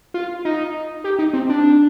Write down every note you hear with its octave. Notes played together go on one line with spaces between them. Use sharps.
F4
D#4
G4
D#4
C4
D4